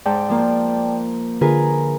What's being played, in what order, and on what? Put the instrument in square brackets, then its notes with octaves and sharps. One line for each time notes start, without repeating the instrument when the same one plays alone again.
[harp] G#2 [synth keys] D5 G5 A5
[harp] F3 A#3
[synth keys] D3 F4 [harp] G#4 A#4 B4